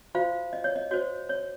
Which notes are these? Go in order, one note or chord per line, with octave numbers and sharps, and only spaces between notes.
F4 F#4 C5 F5
D#5
C#5
D#5
F#4 C5 C#5
C#5